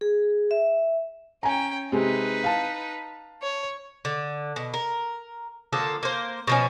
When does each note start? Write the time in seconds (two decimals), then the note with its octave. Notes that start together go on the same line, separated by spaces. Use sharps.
0.01 G#4
0.51 E5
1.43 C#4 G5 G#5 A#5
1.92 C3 G#3 D#4 B4
2.44 F5 A5
3.42 C#5
4.05 D3
4.56 B2
4.74 A#4
5.73 D3 F3 A#3 A4
6.03 A#3 C5
6.47 B2 F3 C#4